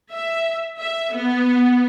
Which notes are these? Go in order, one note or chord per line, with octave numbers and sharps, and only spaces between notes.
E5
E5
B3